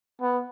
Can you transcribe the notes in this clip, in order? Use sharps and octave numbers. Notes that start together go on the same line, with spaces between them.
B3